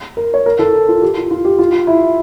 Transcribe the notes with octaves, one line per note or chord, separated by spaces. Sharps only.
A#4
C#5
A#4
A4
F4
G4
F4
F4
G4
F4
E4